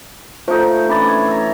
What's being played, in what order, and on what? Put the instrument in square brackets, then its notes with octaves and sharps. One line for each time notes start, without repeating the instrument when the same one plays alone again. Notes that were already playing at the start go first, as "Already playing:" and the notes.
[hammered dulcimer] A3 D#4 [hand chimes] F4 C5
[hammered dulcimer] E3 D4 [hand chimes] C#4 B5 A6
[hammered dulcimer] C#5 [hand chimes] G#6
[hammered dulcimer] E5 A#5